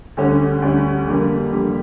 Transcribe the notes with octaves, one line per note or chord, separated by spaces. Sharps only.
D2 D3 G3 C#4
D2 D3 G3 C#4
F2 D3 G3 A#3
F2 D3 G3 A#3